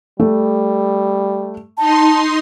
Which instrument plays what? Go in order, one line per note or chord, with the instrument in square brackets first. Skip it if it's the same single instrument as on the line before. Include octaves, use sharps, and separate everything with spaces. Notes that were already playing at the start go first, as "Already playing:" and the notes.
[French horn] G3 [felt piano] A3
[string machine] D#4 C6 [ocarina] A5